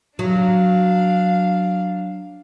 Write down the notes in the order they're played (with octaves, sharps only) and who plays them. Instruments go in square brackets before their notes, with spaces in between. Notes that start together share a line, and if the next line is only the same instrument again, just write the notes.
[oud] F#3 [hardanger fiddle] D4 F5